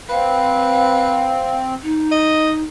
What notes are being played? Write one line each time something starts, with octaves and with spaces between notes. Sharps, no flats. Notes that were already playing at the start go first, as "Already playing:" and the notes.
C4 B4 F5
D#4
D#5